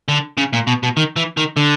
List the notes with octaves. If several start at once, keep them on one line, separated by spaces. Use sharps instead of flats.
D3
C#3
A#2
B2
B2
D#3
E3
D#3
D3